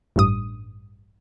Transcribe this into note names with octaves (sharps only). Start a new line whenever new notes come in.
A1 G2 D#6